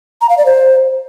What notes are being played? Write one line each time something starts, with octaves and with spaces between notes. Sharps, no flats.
A#5
F5
D5
C5